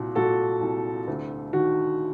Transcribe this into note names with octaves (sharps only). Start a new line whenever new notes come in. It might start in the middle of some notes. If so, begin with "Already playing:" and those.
Already playing: C2 A#2 F#4
A#2 F#4 A4
C2
D2
D#3 F#4